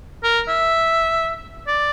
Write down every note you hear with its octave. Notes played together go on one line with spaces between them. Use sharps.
A#4
E5
D5